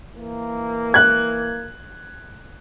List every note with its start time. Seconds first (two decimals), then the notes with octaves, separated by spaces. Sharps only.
0.17 E3 A#3
0.94 F#6 G#6